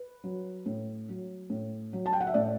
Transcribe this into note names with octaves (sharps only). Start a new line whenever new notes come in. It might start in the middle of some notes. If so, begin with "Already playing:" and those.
Already playing: B4
F#3
A2
F#3
A2
F#3
A5
G5
F#5
E5
A2 D5